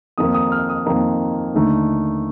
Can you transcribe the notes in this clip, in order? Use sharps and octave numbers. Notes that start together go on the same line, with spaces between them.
F2 D#3 A#3 D#4 D#6
D#6
F6
D#6
F2 D#3 A#3 D#4
D#2 D3 A3 D#4